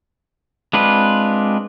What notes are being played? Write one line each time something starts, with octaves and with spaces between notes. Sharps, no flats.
G#3 C4 D4 F4 B4